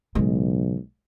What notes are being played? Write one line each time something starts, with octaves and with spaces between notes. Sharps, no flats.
B1 A2 C#3 F#3 G#3